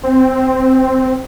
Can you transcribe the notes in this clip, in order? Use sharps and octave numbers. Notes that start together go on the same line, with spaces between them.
C4